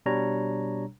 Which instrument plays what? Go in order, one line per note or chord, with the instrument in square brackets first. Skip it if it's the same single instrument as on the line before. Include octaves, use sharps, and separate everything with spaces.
[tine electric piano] B2 G3 D4 C#5 A#5